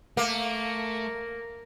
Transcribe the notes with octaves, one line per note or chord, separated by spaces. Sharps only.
A3 A#3